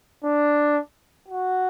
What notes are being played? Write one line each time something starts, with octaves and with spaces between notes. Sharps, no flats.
D4
F#4